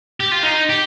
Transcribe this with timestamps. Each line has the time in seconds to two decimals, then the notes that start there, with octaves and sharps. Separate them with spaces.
0.20 G4
0.32 F4
0.43 D#4
0.69 G4